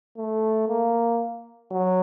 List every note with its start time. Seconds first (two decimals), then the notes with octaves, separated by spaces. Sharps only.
0.18 A3
0.69 A#3
1.71 F#3